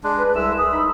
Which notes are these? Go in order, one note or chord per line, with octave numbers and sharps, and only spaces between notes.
G#3 D4
B4
C2 G#3 E5 E6
G#4
D#4 B5